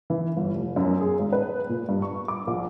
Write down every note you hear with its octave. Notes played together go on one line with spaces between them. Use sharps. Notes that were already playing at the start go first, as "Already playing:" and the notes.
E3
G1
F1
F#2
G#4
G#1
B4
A#2
G2
C#6
D6
A#1